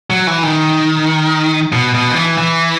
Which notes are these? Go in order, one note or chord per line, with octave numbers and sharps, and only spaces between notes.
F#3
E3
D#3
B2
B2
D#3
E3
E3